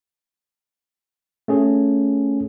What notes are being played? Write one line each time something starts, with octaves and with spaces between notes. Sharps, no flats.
A3 C#4 G#4